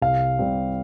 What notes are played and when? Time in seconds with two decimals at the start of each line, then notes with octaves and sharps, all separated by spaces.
0.02 C2 F5
0.39 C3 G3 C4